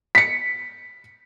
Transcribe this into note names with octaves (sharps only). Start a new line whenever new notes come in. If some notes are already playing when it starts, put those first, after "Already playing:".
B6 C#7